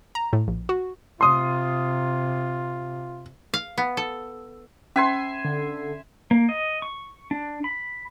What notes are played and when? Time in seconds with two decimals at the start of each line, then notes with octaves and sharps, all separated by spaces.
0.15 A#5
0.33 A2
0.48 A#1
0.69 F#4
1.21 C3 F4 C6 D#6
3.54 F5
3.78 B3
3.97 A4
4.96 C#4 E5 G#5 C6
5.45 D3
6.31 A#3
6.49 D#5
6.82 C#6
7.31 D4
7.64 B5